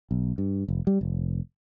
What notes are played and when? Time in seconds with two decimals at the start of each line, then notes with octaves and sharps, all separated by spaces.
0.11 B1
0.38 G2
0.68 F1
0.87 G3
1.01 F1